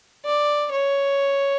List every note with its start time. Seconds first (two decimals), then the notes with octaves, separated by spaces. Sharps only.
0.25 D5
0.72 C#5